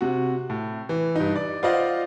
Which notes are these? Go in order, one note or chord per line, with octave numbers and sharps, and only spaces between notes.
C3 F#4
A2
E3
G2 D#4
D5
F4 C5 D5 D#5 F5 F#5